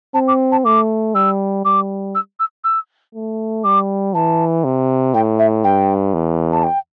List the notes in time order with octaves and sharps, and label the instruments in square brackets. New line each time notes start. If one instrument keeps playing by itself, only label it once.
[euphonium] C4 [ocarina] A5
[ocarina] D6
A5
[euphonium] A3 [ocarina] D6
[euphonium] G3 [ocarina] E6
[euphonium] G3 [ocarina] D6
[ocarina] E6
E6
E6
[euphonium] A3
[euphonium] G3 [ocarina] D6
[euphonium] E3 [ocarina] A5
[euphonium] C3
[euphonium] A2 [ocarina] G5
[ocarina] E5
[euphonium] G2 [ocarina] G5
[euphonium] E2
[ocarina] A5
G5